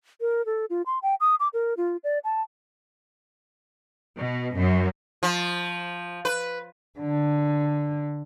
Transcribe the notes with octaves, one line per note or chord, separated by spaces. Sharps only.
A#4
A4
F4
C6
G5
D#6
D6
A#4
F4
D5
A5
B2
F#2
F3
B4
D3